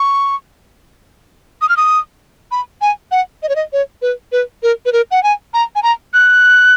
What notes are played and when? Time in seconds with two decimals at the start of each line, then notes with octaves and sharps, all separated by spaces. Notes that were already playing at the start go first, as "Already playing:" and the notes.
Already playing: C#6
1.61 D#6
1.69 F6
1.77 D#6
2.51 B5
2.81 G#5
3.11 F#5
3.43 D#5
3.49 C#5
3.55 D#5
3.73 C#5
4.02 B4
4.32 B4
4.63 A#4
4.85 B4
4.92 A#4
5.11 F#5
5.23 G#5
5.54 A#5
5.75 G#5
5.83 A#5
6.14 F#6